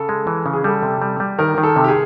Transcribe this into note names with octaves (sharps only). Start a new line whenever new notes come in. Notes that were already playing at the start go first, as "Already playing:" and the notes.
Already playing: C#3 A4
G#3
E3
C#3
G#4
G3 A4
C3
G3
G3
D#3 A#4
D#3
A4
C3
G4
G#4